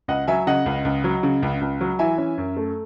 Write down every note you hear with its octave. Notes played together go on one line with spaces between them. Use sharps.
C#2 D#5 F#5
F#3 E5 G#5
C#3 D#5 F#5
C#2
C#2
F#3
C#3
C#2
C#2
F#3
E3 E5 G#5
C#4
F#2
A3